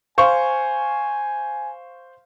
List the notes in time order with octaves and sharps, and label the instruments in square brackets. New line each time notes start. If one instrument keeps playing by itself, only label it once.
[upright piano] C5 F5 C#6 [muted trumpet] G#5